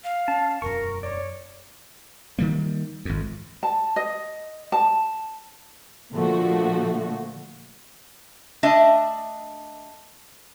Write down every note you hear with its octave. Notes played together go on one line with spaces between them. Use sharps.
F5
C#4 A5
E1 F#2 A#4 C#6
C#5 D5
D#3 G3 A#3
G#1 F2
A5
D#5
A5
A#2 D3 F3 A3 F#4
A3 D4 D#5 E5